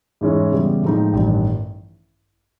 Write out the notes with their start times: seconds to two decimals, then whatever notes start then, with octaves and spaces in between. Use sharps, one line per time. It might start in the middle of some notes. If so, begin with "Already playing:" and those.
0.21 G#2 E3 G#3 C#4 E4
0.52 C#3 E3 G3 B3
0.82 A2 F3 G#3 C4 D#4
1.13 A1 G2 D#3